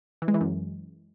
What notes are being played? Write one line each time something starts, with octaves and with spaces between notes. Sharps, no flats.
E3
G#3
E3
F#2